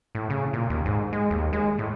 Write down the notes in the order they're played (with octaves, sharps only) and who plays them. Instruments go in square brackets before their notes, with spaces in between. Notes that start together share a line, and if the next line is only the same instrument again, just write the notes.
[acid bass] A2
C#3
A#2
D#2
G#2
G#3
D#2
G#3
A2